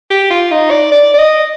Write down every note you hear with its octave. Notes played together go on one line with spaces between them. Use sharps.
G4
F4
D#4
D5
D5
D5
D#5